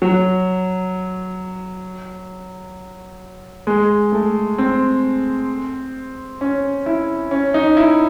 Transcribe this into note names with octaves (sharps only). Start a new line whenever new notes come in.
F#3
G#3
A3
C4
C#4
E4
C#4
D#4
E4